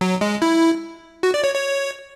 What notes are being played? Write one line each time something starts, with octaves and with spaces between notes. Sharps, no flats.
F#3
G#3
E4
F#4
D5
C#5
C#5